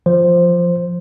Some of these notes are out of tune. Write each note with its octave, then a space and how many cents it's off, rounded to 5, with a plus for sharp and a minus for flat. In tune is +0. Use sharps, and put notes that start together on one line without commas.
F3 +0 C5 +0